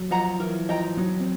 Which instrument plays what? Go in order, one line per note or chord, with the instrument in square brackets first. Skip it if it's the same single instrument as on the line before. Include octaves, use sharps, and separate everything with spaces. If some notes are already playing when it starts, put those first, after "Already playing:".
Already playing: [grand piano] F#3
[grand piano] F3 [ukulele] D#5 F#5 A#5
[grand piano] E3 [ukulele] A#4
[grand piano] F3 [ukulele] D#5 G5 A#5
[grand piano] F#3 [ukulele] D#4
[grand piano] C4